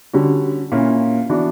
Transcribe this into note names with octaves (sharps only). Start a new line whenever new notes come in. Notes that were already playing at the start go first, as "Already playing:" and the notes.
D3 G3 C#4 F#4
A#2 A#3 C#4 E4
E3 B3 D4 F#4